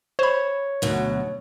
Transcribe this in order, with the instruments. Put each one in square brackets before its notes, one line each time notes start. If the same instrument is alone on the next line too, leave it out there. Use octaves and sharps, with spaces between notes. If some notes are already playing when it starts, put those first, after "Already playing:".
[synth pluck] C5 B5 [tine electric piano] C#5
[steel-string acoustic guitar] D2 B2 F#3